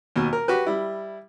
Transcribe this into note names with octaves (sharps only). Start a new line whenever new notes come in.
D#2 B2
A#4
F#4 G4 B4
G3 E4